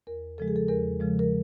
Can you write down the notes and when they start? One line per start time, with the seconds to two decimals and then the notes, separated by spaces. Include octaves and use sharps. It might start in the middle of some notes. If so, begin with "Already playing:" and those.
0.07 E2 A#4
0.38 C#3 F3 G#3 A4
0.48 G#4
0.56 A4
0.68 E2 A#4
1.00 C#3 F3 G#3
1.19 A#4